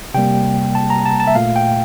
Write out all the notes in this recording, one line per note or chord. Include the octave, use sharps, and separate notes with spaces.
C3 G3 A#3 G5
A5
A#5
A5
A5
E5
A#2 A3 F5
G5